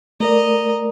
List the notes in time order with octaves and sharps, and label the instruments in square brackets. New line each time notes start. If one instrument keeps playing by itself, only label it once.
[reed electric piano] A3 A#4 D5 [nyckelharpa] D#5 A#5